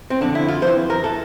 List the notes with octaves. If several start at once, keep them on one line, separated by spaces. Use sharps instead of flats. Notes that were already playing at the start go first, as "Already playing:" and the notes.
C4
F2 D3 D4
E4
F4
F2 E3 C5
A#4
E3 A4